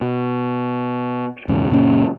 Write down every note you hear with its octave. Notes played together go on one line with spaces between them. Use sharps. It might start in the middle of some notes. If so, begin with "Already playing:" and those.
B2
E1 E2 G#2 C#3
F#1 A#2 A#3 C#4